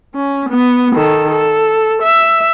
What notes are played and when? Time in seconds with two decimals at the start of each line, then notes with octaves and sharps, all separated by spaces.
0.15 C#4
0.49 B3
0.96 D#3 A4
1.31 A4
2.03 E5